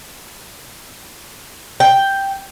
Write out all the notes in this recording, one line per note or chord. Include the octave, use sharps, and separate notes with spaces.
G5